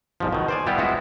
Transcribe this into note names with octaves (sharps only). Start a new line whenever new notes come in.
C2 G#2 F3
B2 D#3
C5 D5 G#5
G3 B3 E4 F4 G4
G#3 B3 E4 F#4